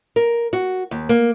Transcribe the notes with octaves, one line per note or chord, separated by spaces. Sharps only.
A#4
F#4
D#2
A#3